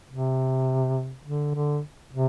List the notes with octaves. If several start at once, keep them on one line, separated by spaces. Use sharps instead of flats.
C3
D3
D3
C3